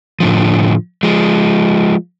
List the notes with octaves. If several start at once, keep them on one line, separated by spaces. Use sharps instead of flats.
A2 D3 F3
F3 G#3